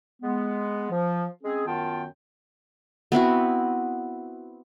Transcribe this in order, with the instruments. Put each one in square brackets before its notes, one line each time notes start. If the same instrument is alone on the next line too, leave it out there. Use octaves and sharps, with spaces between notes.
[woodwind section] G#3 B3
F3
G#3 C4 C#4 G#4
F#2 D#3 B3 F4 G5 A5
[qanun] B3 C4 E4 F#4